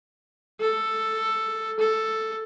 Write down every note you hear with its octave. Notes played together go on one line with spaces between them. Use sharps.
A4
A4